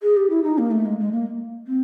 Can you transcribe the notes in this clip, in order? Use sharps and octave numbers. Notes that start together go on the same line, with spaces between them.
G#4
G4
E4
D#4
A#3
A3
G#3
G#3
A#3
C4